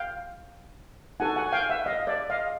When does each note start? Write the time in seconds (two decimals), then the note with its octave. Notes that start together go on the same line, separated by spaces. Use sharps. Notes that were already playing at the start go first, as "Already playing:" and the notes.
Already playing: F5 G5
1.20 D#4 F#4 A4 F#5 G#5
1.36 F#5 G#5
1.48 G#5
1.52 F5 G5
1.70 E5 F#5
1.86 D#5 F5
2.07 D5 E5
2.30 D#5 F5